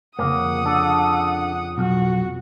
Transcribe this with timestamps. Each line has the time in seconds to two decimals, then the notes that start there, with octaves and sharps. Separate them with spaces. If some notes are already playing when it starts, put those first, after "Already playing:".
0.19 F2 C#3 A#3 F#5 D#6
0.66 D4 A4
1.78 B1 F#4